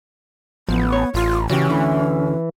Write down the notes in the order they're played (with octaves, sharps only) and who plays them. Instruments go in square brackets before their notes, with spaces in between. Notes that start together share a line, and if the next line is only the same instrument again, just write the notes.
[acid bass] A1 [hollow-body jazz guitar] F3 [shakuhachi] B3
[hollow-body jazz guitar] C#5
[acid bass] A1 [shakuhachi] F4
[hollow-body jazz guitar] C#3 F#4 G4 [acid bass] E3 [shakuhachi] C#4
[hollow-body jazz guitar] D2 D3 E4